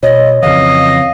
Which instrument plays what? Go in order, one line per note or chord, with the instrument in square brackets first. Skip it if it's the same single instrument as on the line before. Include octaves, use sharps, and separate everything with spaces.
[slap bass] B2 [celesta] C#5 [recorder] D#5
[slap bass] F2 C#3 E3 [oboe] D#5 [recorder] F5